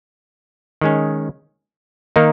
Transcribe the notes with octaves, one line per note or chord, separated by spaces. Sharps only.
D#3 G#3 C#4
D#3 A#3 D#4 A#4